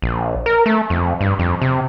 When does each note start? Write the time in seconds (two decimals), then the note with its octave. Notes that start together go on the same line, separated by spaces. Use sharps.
0.02 A#1
0.46 A#4
0.66 A3
0.90 F2
1.21 G2
1.39 F2
1.62 C3